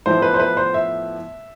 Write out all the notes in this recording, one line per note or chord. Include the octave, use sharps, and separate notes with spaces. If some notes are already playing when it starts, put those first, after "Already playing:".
A2 F3 B3 E4 C5
B4
C5
B4
C5
E5